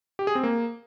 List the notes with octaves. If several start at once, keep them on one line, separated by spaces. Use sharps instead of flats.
G4
G#4
C4
A#3